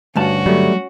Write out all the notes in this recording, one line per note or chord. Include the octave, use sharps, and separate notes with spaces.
D2 G2 C#4 F#4 A5
F#3 G3 A3